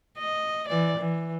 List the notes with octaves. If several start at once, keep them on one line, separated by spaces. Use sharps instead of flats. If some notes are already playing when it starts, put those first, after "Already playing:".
D#5
E3 D5
E3